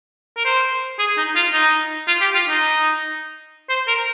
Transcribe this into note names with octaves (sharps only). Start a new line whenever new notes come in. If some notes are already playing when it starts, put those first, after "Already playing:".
A#4
C5
G#4
D#4
F4
D#4
F4
G4
F4
D#4
C5
A#4